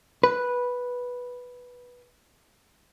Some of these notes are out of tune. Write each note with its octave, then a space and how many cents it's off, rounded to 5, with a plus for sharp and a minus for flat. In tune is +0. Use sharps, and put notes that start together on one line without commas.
B4 -5